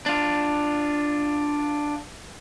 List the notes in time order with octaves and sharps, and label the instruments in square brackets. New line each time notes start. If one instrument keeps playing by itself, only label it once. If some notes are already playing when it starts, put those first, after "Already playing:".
[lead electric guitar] D4 F4